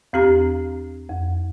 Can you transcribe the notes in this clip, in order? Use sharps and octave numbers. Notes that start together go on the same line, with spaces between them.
E2 C4 G4 A#5
F2